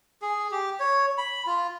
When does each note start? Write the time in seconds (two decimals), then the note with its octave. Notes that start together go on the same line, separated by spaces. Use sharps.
0.22 G#4
0.51 G4
0.80 C#5
1.18 B5
1.47 F4